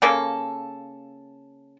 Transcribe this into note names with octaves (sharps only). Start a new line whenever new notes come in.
C#3 A#3 A4